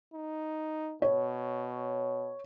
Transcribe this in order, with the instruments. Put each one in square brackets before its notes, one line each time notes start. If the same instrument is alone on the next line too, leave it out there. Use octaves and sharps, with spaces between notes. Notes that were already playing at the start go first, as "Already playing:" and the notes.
[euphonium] D#4
[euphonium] B2 [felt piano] C#5